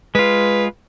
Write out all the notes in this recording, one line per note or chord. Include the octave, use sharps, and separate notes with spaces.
G#3 F4 B4